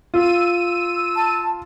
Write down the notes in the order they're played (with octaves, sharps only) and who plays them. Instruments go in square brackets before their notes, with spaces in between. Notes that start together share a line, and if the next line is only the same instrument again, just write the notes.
[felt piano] F4 [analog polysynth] E6 D#7
[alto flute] A5